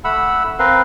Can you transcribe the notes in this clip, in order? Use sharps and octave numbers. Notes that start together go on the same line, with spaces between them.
A3 F#5 B5 E6
C4 A#4 B4 F5